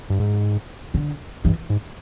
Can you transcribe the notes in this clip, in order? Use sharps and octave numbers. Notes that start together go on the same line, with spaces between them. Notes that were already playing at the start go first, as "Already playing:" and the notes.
G2
G#2
D3
G2 E3
G#2